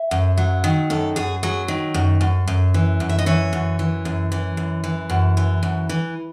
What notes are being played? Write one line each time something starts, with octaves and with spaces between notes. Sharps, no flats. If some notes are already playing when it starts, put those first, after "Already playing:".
Already playing: E5
F#2
F#3
D#3
F#2 A4
F#2 G#4
F#3 G#4
D#3
F#2
F#2
F#2
E3
F#2
E5
D#5
E3 C#5
F#2
E3
F#2
E3
F#2
E3
F#2
E3
F#2
E3